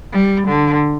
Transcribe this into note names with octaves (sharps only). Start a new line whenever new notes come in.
G3
D3